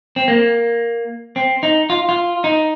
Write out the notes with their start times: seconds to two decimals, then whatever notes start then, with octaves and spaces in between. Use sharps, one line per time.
0.16 C4
0.28 A#3
1.36 C4
1.63 D#4
1.90 F4
2.09 F4
2.44 D#4